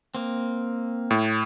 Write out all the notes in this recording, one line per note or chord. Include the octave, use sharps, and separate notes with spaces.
A#3 C4
A2